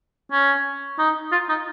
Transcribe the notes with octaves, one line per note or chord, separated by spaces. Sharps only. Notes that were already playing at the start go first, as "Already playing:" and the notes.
C#4
D#4
F4
D#4